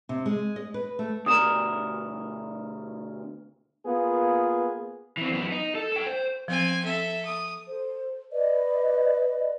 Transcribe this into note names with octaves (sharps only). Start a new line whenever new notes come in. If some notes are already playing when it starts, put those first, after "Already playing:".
C3
G#3
D#5
B4
A3
D2 B2 A#4 D#6 E7
A#3 B3 F4 G#4
E3 C4
F#2 B3
D#4
A4
A4 G5
C5
F3 C4 G#5
A4 E5
D#6
A4 C5
B4 D5 D#5